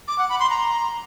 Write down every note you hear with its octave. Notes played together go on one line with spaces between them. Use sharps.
D6
F#5
B5
C6
A#5